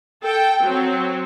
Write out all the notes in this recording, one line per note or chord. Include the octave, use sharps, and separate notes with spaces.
A4 G5
F#3 C4